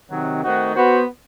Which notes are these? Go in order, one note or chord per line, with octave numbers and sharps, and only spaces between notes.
C3 D#3 F#3
D#3 A3 C4 D#4 F#4
B3 F#4 C5